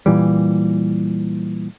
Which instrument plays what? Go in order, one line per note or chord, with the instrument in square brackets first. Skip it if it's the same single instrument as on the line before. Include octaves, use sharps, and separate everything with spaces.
[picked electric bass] A#2 E3 G3